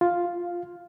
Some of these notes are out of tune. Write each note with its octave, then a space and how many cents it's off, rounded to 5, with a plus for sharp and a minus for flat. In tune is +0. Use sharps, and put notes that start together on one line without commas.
F4 +5 F5 +0